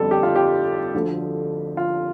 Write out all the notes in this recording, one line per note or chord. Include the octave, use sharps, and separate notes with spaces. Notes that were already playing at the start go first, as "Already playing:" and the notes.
Already playing: G1 F2 D3 G3 A4
G4
F4
G4
D2 D3 F3 A3
F4